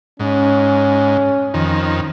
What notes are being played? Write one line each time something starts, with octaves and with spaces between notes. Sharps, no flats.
G#2 C#4
F2 D#3